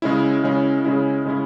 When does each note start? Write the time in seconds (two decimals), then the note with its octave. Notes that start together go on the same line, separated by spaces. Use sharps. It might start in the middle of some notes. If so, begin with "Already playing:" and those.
0.02 C#3 G#3 C#4 E4
0.43 C#3 G#3 C#4 E4
0.85 C#3 G#3 C#4 E4
1.25 C#3 G#3 C#4 E4